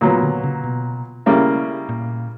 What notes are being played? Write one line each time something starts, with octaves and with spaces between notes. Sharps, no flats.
A#2 D3 F#3 B3
D3
C#3
B2
C#3 G3 A#3 E4
A#2